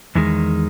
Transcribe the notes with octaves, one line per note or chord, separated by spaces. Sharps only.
E2 D#3 G#3